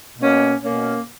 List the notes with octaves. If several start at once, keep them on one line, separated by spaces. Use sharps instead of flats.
B2 A#3 C#4
B2 A#3 C#4